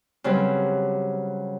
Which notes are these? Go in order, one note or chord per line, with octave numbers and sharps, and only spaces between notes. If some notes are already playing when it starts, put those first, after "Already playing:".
C#3 F#3 G3 C4 B4